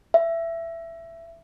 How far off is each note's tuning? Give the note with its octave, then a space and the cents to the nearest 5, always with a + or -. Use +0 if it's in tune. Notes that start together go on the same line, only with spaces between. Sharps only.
E5 +15